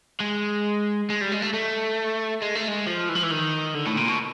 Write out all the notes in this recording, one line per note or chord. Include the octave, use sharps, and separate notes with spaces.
G#3
G#3
G3
G#3
A3
A3
G#3
A3
G#3
F3
E3
F3
E3
D#3
D3
A2
A#2
B2